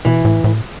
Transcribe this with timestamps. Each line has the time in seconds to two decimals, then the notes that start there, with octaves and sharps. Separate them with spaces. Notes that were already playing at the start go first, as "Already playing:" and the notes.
0.05 B2 E3
0.25 A2
0.44 A2